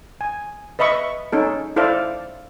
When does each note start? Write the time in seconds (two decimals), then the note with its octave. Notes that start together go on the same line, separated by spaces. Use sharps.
0.21 G#5
0.79 B4 D#5 E5 B5 C#6
1.32 C#4 D#4 A4
1.76 E4 A4 C5 D5 F5